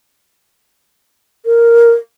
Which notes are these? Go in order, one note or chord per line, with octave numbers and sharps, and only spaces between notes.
A#4